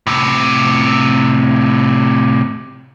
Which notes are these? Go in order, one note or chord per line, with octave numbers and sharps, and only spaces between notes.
A2 C3